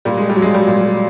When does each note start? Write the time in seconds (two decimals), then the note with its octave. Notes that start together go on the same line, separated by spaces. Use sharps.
0.05 A#2 G3
0.17 G#3
0.29 G3
0.36 F#3
0.42 G#3
0.54 G3
0.67 A#2 G3